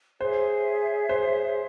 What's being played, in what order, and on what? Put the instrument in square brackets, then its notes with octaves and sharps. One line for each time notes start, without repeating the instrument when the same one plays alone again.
[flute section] G#4 C#5 E5 [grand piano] C5
[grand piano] C5